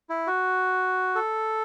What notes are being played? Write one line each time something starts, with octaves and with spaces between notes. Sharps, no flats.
E4
F#4
A4